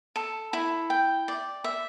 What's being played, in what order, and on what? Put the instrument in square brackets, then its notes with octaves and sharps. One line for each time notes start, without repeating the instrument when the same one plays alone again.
[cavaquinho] A4
E4
G5
D5
E5